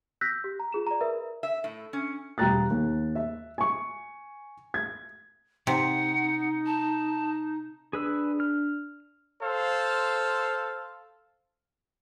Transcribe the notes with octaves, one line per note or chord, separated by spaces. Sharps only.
E6 F#6 G6 A#6 B6
G4
A#5
F4 G#4 E7
D5 A#5
A#4 B4 E5
E5
A2
C#4
E1 G3 G5 A#5 F#6 A6
D#2
E5
G#5 C#6
G#6
C3 D#4 F#5
A5
D4 G#4 B4 E6
F6
A4 C5 F5